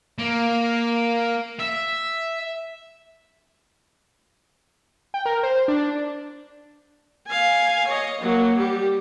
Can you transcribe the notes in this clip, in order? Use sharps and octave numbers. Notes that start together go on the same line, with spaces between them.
A#3
E5
G5
A#4
C5
D4
F5 G#5
C#5 D#5
F#3 A#3
G3 G4